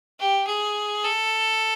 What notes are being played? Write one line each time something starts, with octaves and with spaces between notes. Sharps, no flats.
G4
G#4
A4